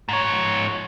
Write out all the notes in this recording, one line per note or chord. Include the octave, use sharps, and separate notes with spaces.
G#2 C#5